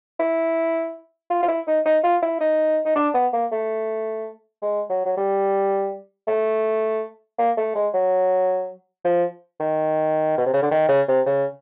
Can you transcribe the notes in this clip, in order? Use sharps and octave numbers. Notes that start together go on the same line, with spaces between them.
E4
F4
F4
E4
D#4
D#4
F4
E4
D#4
D#4
D4
B3
A#3
A3
G#3
F#3
F#3
G3
A3
A#3
A3
G#3
F#3
F3
D#3
B2
C3
C#3
D3
D#3
C#3
C3
C#3